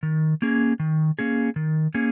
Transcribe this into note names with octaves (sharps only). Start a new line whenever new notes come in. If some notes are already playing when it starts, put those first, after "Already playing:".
D#3
A#3 C#4 G#4
D#3
A#3 C#4 G#4
D#3
A#3 C#4 G#4